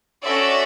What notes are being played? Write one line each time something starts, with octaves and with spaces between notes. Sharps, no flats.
C#4 F#4 A4 D5 E5